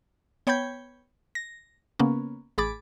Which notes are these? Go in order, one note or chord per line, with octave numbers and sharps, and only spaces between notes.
B3 C#5 G5 B5 G6 G#6
A#6
C#3 A#3 B3 C#4
A1 G#4 B5 D6 A6